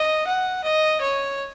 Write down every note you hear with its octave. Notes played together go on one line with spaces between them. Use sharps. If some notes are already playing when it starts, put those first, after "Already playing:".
Already playing: D#5
F#5
D#5
C#5